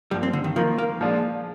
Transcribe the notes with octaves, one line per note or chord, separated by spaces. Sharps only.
G2 F3 G3 A#3
C4
D3
D#3
D#3 F3 A#3 F4 A#4
A#3
A#2 F3 G#3 D4 F4